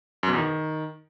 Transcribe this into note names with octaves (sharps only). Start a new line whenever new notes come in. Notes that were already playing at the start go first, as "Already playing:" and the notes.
F#2
B2
E2
D#3